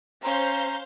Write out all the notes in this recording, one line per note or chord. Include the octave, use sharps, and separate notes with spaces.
C#4 C5 F5 A#5 G6